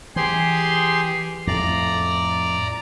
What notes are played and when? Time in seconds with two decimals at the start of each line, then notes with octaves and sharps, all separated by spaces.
0.16 E3 G4 G#4 C6
1.47 F2 A2 D5 A#5